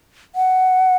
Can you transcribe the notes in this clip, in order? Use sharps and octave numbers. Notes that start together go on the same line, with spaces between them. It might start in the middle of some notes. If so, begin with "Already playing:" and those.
F#5